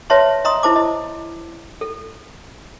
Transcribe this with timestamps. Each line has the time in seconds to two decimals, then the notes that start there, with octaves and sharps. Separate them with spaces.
0.10 B4 C#5 E5 A5 C6
0.45 D#5 A#5 C6 D#6
0.63 E4 C5 A5 D6
0.76 D#5
1.81 A4